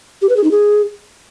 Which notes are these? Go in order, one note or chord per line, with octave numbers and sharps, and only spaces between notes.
G4
B4
G#4
D#4
G#4